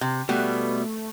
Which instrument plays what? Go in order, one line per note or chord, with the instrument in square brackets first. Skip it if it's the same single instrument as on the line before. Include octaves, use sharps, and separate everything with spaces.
[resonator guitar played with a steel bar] C3
[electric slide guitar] B2 [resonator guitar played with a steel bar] G3 B3 [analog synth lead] A3